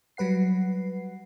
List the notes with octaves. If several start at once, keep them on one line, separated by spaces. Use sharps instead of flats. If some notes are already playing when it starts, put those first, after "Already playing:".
F#3 G3 B4 F#5 C7